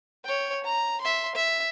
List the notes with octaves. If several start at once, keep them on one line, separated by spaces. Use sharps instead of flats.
C#5 G5
A#5
E5 C6
E5